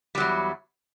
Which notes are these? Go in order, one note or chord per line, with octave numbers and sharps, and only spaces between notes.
E2 F#3 G3